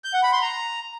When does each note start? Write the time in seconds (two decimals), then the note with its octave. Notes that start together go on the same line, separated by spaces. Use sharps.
0.04 G6
0.14 F#5
0.23 B5
0.32 C6
0.42 A#5